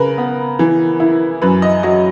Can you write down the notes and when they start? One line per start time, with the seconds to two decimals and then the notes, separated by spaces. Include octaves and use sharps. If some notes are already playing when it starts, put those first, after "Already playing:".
Already playing: C#3 A#4 B4
0.18 B3
0.59 E3
1.00 E4
1.42 F#2 B4
1.62 D#5
1.83 F#3 D#5